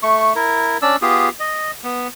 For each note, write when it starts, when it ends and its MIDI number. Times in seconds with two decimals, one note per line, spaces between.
0.03 0.33 57
0.03 0.33 85
0.36 0.77 64
0.36 0.77 70
0.82 0.96 61
0.82 0.96 62
0.82 0.96 74
0.82 0.96 88
1.02 1.29 59
1.02 1.29 65
1.02 1.29 67
1.02 1.29 68
1.40 1.71 75
1.84 2.08 59